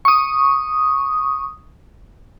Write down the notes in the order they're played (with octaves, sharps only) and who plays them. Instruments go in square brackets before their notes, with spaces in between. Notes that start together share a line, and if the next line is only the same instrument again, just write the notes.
[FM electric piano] C#6 D#6